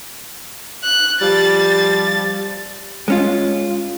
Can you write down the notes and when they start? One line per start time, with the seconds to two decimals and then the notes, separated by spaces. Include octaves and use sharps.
0.84 F#6
1.22 F3 G3 A6
3.08 G#3 C#4 F4